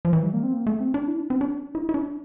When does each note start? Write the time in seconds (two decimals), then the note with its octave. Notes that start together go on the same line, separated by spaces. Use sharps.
0.05 F3
0.13 E3
0.23 G3
0.34 A#3
0.43 C4
0.53 A#3
0.67 A3
0.80 C4
0.94 D4
1.08 E4
1.21 D4
1.30 C4
1.41 D4
1.75 E4
1.89 E4
1.94 D4